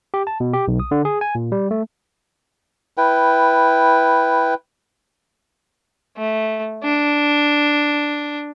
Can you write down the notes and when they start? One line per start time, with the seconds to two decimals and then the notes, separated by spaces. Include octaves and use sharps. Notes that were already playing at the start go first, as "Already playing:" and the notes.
0.14 G4
0.27 A5
0.40 B2
0.53 G4
0.68 B1
0.80 D#6
0.91 D3
1.05 G#4
1.21 G#5
1.35 A#2
1.52 G3
1.71 A3
2.97 E4 B4 G5
6.17 A3
6.84 D4